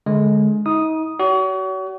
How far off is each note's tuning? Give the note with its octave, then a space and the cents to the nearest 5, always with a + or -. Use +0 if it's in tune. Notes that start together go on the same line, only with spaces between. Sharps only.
D3 +10 G#3 +20
D#4 +35 D#6 +0
F#4 +35 C#5 +40